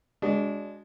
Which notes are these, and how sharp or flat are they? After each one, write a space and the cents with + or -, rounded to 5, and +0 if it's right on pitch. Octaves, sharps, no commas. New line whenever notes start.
G#3 -5 D4 -25 F#4 +0